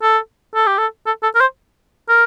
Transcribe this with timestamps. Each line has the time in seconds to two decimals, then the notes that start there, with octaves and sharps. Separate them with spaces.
0.03 A4
0.55 A4
0.67 G4
0.78 A4
1.07 A4
1.23 A4
1.35 A#4
1.41 C5
2.09 A#4